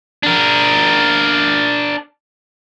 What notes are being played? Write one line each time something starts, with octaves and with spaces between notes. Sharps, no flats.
D4 A#4